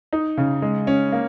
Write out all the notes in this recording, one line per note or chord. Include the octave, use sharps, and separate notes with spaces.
D#4
C#3
G#3
C#4
A#3